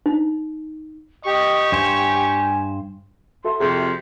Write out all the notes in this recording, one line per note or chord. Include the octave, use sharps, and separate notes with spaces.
D#4
G4 D#5 C#6
G2 C5 G#5
F#4 A4 E5 C6
F2 C3 G#4